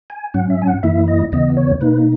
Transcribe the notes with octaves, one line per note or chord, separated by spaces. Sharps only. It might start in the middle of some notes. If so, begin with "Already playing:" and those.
G#5
G#2 F#3 C#4 F#5
E5
G#5
F#5
F#2 E3 A#3 E4 E5
D#5
D#2 C#3 E3 B3 D#5
C#5
B2 A#3 D#4 B4